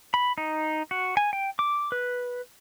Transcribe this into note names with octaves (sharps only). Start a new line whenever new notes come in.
B5
D#4
F#4
G#5
G5
D6
B4